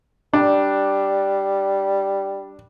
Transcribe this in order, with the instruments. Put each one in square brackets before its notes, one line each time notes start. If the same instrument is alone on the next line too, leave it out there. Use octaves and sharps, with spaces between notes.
[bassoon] G3 [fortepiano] D4